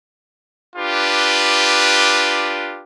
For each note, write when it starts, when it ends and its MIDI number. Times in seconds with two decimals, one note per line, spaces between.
0.76 2.83 62
0.76 2.83 65
0.76 2.83 67
0.76 2.83 71